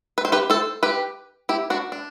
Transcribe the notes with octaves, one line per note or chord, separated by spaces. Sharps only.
B4
C5
G4 B4
A4 C5
G4 B4
E4 G4
D4 F#4
D4